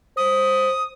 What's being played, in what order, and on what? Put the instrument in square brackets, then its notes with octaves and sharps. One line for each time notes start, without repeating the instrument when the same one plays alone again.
[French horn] C5 [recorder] D#6